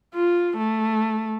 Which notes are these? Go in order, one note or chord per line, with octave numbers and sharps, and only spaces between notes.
F4
A3